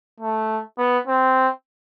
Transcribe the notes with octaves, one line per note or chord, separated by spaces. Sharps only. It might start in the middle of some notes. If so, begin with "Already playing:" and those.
A3
B3
C4